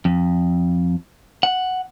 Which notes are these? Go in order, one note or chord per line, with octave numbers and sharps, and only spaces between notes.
F2
F#5